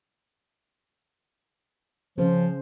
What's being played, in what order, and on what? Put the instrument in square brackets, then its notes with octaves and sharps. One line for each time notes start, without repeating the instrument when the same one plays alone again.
[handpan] C#3 C#4 C5 [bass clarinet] F3